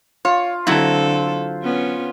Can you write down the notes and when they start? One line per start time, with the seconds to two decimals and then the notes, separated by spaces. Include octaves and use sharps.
0.25 F4 C#5
0.67 D3 F#3 C4 E4 A4 C5
1.63 B3 C#4 F4